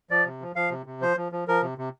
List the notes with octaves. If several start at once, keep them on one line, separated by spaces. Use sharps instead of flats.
F3 D5
C3
F3
F3 F5
C3
C3
F3 C5
F3
F3
F3 A#4
C3
C3